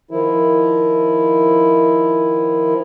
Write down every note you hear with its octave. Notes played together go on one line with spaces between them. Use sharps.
D#3 F3 E4